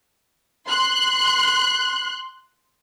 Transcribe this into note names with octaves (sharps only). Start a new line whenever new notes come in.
C6 F#6